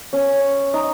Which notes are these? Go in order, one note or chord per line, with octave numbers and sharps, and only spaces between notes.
C#4
D#4